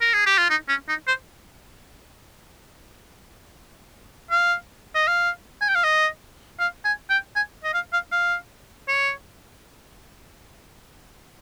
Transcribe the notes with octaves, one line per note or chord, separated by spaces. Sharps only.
A#4
G#4
G4
F4
D#4
C#4
D#4
C5
F5
D#5
F5
G#5
G5
F5
D#5
F5
G#5
G5
G#5
D#5
F5
F5
F5
C#5